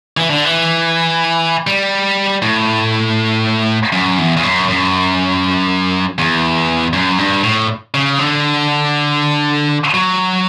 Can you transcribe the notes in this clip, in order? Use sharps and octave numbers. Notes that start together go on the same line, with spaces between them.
E3
D3
E3
G3
A2
F#2
E2
E2
F#2
F#2
E2
F#2
G2
A2
C#3
D3
F#3